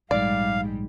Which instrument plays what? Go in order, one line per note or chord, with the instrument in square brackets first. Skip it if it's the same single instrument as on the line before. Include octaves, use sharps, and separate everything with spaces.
[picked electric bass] A#1 G#2 [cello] G3 G#3 [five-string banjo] D5 [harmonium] F5